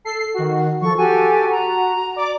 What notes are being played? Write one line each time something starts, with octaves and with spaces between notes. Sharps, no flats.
A4 C7
D#3 F#4
F3 A4 C#6
F#4 G4 A4 G#5
A#5
D5 D6